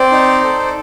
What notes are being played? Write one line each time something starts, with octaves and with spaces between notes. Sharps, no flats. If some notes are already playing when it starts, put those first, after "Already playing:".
Already playing: C4 C5 D5
D#4
A4